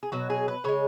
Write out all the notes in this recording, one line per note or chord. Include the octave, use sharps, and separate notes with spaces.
G#4
B2 F#3 F#4
G#4
B4
C#3 G#3 C#5